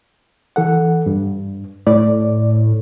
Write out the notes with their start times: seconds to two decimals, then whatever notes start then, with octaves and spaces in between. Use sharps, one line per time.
0.56 E3 A4 F#5
1.06 G2
1.87 A2 D5